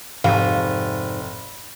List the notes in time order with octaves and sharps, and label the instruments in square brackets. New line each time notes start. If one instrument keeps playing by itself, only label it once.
[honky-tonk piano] F1 [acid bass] G#2 [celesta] F5